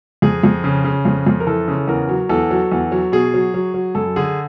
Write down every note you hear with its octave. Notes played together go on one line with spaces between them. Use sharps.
F2 G#4
F2
C#3
C#3
F2
F2
A#4
E3 A4
C#3
E2 A#4
F#3
E2 A4
F#3
E2
F#3
B2 G#4
F#3
F#3
F#3
F#2 A4
D3 G#4